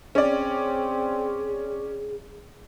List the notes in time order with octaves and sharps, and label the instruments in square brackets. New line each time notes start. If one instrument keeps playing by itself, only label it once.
[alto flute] C4 [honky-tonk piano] C#4 D5 [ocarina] G#4